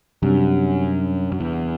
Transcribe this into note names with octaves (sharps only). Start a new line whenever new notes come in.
F#2 C3 G3 D4
F#2
E2